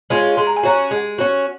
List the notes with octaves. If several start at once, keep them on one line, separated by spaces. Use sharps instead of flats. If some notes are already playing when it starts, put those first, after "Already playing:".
G#3 C#4 F4
G#3 C6
A#5
G#5
C#4 F#4 A#5
G#3
C#4 F#4